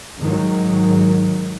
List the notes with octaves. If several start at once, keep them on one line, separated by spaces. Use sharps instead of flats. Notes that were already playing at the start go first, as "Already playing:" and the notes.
G#2 D#3 F#3